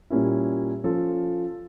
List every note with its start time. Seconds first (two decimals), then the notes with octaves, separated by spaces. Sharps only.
0.10 A#2 G3 A#3 C#4 E4
0.84 F3 C#4 F4 A4